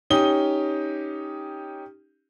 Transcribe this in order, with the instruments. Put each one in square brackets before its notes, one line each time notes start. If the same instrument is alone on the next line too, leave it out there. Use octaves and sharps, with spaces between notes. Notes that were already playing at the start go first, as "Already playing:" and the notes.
[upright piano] C#4 D#4 G4 D#6 G7